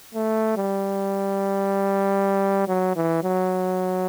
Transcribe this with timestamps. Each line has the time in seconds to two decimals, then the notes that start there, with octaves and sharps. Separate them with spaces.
0.14 A3
0.57 G3
2.68 F#3
2.96 E3
3.23 F#3